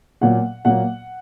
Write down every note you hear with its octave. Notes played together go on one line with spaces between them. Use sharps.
A#2 F#3 A#3 F#5
A#2 F#3 A#3 F#5